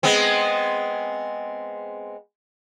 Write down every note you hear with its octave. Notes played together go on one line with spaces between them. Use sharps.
G#3 B3 C4